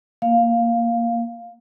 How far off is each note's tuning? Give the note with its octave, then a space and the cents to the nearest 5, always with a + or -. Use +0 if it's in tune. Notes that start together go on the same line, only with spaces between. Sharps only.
A#3 +0 F5 +0